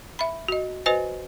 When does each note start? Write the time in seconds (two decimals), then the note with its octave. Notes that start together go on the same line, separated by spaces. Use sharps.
0.19 E5 B5
0.48 F#4 D#5
0.86 F#4 B4 C5 D#5 G#5